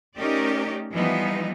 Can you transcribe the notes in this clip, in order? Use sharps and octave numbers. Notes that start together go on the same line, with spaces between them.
A3 C#4 D#4 G4 A#4 D5
E3 F3 G3 B3 D#4